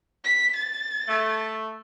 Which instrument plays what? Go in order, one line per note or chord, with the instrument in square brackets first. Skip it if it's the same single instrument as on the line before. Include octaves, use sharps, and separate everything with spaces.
[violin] B6
A6
[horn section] A3